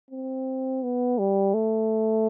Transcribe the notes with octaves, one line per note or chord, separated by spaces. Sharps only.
C4
B3
G3
A3